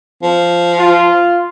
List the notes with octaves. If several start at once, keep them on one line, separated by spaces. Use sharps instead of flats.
F3
F4